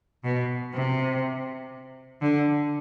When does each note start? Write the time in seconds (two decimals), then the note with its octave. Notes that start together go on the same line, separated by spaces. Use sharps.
0.24 B2
0.74 C3
2.22 D3